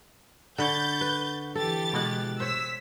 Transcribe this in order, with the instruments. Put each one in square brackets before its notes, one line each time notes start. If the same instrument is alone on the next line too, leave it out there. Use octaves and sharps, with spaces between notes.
[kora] D3 [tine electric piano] F#5 B5 C#6 [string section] G6 A6
[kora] B4
[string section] E3 G4 A6 [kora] A4
[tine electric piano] B2 G#3 F#6
[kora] C5 C#5 [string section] E6 B6